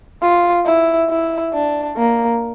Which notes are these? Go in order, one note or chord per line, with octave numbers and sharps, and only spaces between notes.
F4
E4
E4
D4
A#3